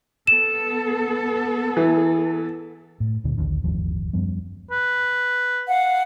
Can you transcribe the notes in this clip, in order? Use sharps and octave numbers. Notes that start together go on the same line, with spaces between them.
B3 A4 E7
E3
A2
D2 A#2 D3
A#1 D#2 D3 D#3
D1 G1 D#2 F3
F#2 F3 G3 B3
B4
F5 F#5